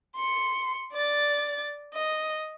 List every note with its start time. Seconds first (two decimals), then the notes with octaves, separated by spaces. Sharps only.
0.16 C6 C#7
0.93 D5 A6
1.94 D#5